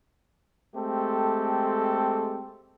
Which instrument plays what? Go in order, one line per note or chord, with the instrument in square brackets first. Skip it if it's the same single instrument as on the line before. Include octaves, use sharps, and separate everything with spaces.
[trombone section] G#3 A3 C4 G4 A4